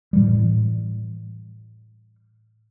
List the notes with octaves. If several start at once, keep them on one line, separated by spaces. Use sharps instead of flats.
A2 E3 G3